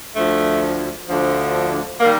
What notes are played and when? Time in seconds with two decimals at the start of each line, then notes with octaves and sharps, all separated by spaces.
0.15 D2 D3 F3 A3
1.08 D2 D3 F3
2.00 D#3 G3 A#3